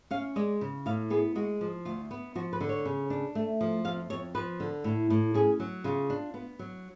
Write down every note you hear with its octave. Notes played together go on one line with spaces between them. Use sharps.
C#4 F5
G#3 D5
C#3
A2 F5
B3 G#4
G#3 F#4
F3
D2 F4
B3
F3 F#4
B4
D3
C#5
C#3
D4
A3
F3
F2 F5
F2 C#5
F3 B4
D3
A2
A2
C#4 G#4
F#3
C#3 F4
D4
B3
F#3